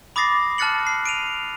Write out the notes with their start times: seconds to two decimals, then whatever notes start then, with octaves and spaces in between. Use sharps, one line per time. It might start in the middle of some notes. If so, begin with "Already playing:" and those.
0.16 B5 D6 D#6 A6 A#6 C7
0.58 A5 F6 F#6 A6 C#7 F#7
0.87 C7
1.06 D7 D#7 F7